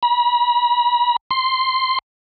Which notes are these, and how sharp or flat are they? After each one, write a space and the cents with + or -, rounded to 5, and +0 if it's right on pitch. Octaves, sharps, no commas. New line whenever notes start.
B5 -40
C6 -5